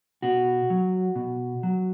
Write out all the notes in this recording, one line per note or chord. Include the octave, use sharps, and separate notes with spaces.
B2 F#4
F#3
B2
F#3